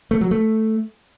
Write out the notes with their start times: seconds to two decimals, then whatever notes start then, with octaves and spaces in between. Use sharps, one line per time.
0.11 A3
0.21 F#3
0.31 A3